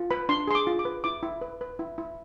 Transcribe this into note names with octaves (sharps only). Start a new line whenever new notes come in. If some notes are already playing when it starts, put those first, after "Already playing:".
Already playing: F4
B4 B5
D4 C6
G#4 C6
D6
F4
D6
B4
E4 D6
E4
B4
B4
E4
E4